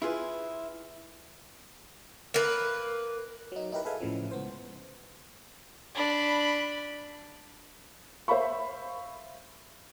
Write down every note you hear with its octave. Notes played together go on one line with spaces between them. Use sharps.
E4 F4 G#4 B4
A#3 B4
F#3 D#4
D#4 E4 G4 A#4 B4
G#4 A4 B4 E5 F5 G#5
A1 C#3 E3 F3
C#2 B3 C5
D4 B5
C5 E5 F5 B5 C#6